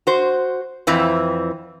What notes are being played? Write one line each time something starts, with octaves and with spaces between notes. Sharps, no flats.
F#4 C5
F2 E3 C4